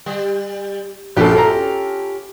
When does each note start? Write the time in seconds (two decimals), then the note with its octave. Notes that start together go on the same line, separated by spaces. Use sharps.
0.06 G3
1.17 A#1 C#4 F4 G4 A4
1.35 A4 A#5